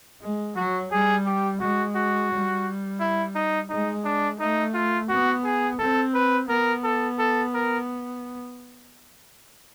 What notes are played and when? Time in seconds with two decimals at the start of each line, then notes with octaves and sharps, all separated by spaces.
0.20 G#3
0.56 F#3 F#4
0.91 G3 G#4
1.26 G4
1.61 G#3 F#4
1.96 F#4
2.30 G3
3.00 E4
3.35 D#4
3.69 G#3 D#4
4.04 D4
4.39 A3 D#4
4.74 F4
5.09 B3 F#4
5.44 G#4
5.79 C4 A4
6.14 B4
6.48 B3 A#4
6.84 A4
7.19 A4
7.54 A#4